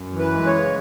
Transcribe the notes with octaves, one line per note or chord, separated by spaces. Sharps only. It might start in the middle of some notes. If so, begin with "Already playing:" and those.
Already playing: F#2
E3
B4
G#3
C#5
C#3